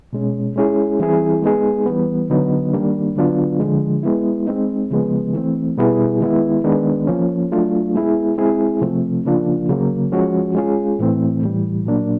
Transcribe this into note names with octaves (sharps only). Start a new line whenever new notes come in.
B2 G#3 C#4
G#3 C#4 E4 G#4
E3 G3 C4 E4 G#4
G#3 B3 D#4 G#4
E3 G3 B3
D3 F#3 B3 D#4
D#3 G3 A#3 D4
D3 F#3 B3 D4 F4
D3 F3 G#3
G#3 B3 E4
G#3 C4 D#4
C#3 F3 G#3 B3
E3 A3 C4
B2 G3 B3 E4 G#4
D#3 G#3 B3 E4
D#3 G#3 B3 D4
F3 A#3 C#4
F#3 A3 D4 F4
G#3 B3 E4 G#4
G#3 C4 E4 G#4
C3 F3 A3 C4
C#3 F3 A#3 D4 F4
C#3 F#3 A#3
F3 G#3 C#4 F#4
G#3 C#4 F4 G#4
A2 E3 A3 C4
A2 E3 G3
A#2 F#3 A#3 D4